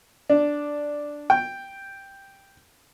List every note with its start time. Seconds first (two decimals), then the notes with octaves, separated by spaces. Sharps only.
0.30 D4
1.30 G5